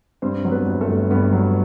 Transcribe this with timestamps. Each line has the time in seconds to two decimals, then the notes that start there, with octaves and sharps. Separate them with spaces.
0.22 G2 C4 C5
0.44 F#3
0.51 B3 B4
0.66 G1
0.81 A3 A4
0.89 G1
1.11 G2 B3 B4
1.33 F#3